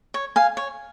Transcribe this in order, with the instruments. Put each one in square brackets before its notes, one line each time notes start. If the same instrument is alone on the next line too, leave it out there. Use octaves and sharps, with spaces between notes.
[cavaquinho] C#5
F5 G#5
C#5